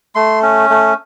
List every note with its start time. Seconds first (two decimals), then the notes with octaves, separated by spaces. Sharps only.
0.15 A3 C6
0.42 C#4
0.70 A3